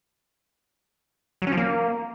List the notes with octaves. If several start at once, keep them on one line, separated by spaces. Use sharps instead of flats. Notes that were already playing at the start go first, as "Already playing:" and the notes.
F#3
C#4
F3
A#3